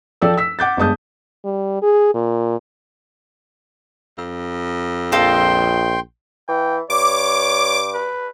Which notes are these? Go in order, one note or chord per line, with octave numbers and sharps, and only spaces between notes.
F3 A4 D5 G5 E6
E6 B6
F#5 D6 G6 A6
G1 G#3 A5 D#6 G6
G3
G#4
A#2
F2
A#1 F4 A4 D#5 G5 C6
E3 G5
G2 C#5 D6
B4